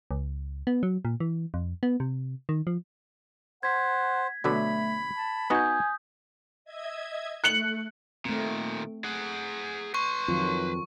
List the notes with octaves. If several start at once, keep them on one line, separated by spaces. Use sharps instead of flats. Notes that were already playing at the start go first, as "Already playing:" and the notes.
C#2
B3
F#3
A#2
E3
F2
B3
C3
D#3
F3
C5 F#5 G#6 B6
B2 D3 F#3 A3 B5
A5
B3 D#4 F#4 G#5 D#6 G6
D#5 E5 G#6
A3 F#6 C#7 F#7
A#2 D#3 A3 C4
G#4 F#5
B4 C6 C#6
F2 D#3 F#3 F4